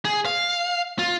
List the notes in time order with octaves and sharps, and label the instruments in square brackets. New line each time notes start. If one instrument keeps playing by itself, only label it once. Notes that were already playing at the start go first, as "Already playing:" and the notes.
[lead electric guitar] G#4
F5
F4